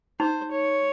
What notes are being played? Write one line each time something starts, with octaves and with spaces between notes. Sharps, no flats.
D#4 C5
C#5